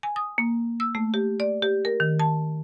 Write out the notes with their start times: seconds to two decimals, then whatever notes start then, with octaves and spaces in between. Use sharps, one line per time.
0.03 G#5
0.16 D#6
0.38 A#3
0.80 E6
0.95 A3
1.14 G4
1.40 D5
1.63 G4
1.85 A#4
2.00 D#3
2.20 A5